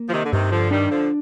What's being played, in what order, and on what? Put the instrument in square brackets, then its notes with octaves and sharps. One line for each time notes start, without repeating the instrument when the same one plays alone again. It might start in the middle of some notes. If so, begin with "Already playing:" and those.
Already playing: [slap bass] A#3
[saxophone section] F3
C3 D#3
D3
[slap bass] G2 [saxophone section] C3 D#3
[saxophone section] D3 F3
[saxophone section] D#3 G3 [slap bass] D4
[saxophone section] D3 F3